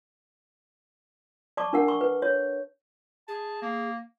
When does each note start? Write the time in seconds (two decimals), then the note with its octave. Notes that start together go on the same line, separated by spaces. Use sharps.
1.57 D5 A5 C#6 D6
1.73 D4 A#4 F#5
1.88 C#6
2.01 B4
2.22 C#5
3.28 G#4 A5
3.62 A#3